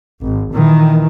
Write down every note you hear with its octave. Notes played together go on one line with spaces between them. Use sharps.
G#1
A#2 D#3 E3